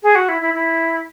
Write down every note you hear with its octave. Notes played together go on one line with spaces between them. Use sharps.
G#4
F#4
E4
E4
E4